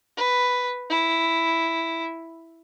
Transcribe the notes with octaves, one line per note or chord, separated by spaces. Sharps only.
B4
E4